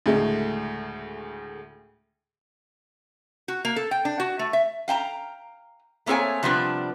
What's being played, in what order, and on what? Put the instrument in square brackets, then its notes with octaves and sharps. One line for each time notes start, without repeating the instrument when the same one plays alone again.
[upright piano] D2 A2 C#3 G#3 A3
[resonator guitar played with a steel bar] F#4
A#3
A4
G5
D4
F#4
A3
E5
F5 G5 A5 A#5
A3 A#3 C4 G#4 C#5 G#5
C3 F3 G3 B3 D4